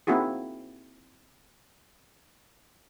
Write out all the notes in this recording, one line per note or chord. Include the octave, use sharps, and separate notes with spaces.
A#3 C4 D#4 E4 F#4 G#4